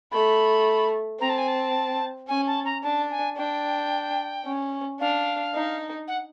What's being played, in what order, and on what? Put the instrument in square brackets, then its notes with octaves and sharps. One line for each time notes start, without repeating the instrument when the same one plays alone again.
[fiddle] A3 [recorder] B5
[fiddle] C4 [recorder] A#5
[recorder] A5
G#5
A5
[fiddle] C#4 [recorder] G#5
[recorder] A5
A#5
[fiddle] D4 [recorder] A5
[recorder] G#5
[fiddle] D4 [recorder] G5
[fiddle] C#4
[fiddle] D4 [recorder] F5
[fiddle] D#4
[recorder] F#5